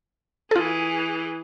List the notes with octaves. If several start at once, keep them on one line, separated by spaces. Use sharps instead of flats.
E3 F4 G#4 A4